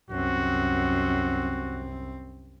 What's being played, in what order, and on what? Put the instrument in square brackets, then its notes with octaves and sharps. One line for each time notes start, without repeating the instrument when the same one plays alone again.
[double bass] C2 C4 [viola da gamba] F#2 [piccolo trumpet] F#4